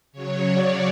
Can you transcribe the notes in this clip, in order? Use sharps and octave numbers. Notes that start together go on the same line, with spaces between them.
C#3 F#3 C#5
D5